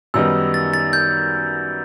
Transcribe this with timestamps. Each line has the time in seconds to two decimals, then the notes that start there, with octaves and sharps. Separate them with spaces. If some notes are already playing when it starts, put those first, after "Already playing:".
0.14 F#2 D#3 G3 B3 D#4 E6
0.54 A6
0.73 A6
0.93 G6